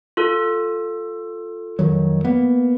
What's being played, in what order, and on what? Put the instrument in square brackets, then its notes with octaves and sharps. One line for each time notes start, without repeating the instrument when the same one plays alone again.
[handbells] F4 A4
[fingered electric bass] F2 D#3 F#3
A#3 B3